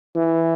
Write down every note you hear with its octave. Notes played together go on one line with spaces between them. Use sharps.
E3